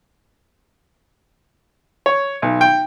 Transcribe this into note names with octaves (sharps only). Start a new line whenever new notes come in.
C#5
B1
G5